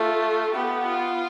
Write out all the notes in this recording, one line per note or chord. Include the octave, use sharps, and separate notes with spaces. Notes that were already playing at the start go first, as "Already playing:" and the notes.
Already playing: A3 F4
B3 G4
F4